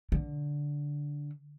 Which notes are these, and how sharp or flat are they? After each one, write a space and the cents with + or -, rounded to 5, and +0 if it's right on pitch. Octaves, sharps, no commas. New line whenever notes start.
D3 -10